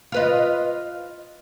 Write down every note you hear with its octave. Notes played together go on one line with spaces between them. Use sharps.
F4 B4 D#5